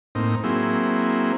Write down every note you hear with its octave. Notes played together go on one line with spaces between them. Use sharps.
A2 A#3 C4 D#4
F#3 A#3 C4 E4 G#4